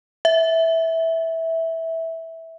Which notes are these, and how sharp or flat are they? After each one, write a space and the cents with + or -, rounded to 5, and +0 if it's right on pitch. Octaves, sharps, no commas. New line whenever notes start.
E5 -10